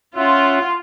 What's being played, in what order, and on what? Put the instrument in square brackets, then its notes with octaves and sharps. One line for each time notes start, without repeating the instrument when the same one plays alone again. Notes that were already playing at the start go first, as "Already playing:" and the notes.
[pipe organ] C#4 E5 F#5 [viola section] F4